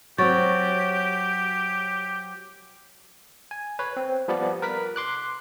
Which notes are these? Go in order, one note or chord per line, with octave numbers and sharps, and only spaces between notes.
F#3 C4 G4 C#5 C#6 A6
G#5
B4 C#5
C4
F3 G3 B3 D5
A#4 B4 B6
C6 D6 F#6